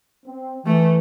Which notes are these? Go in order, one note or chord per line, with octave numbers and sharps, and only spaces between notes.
C4
E3 A3